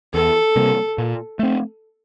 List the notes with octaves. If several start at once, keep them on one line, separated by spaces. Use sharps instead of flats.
E2 A4
C3 G3 A#3
A#2
A3 C4